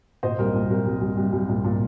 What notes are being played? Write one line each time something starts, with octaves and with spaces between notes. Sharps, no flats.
A#2 C5 D#5
C2 A#4
A#2
C2 A#4
C2
C2
C2
C2
A#2
A#2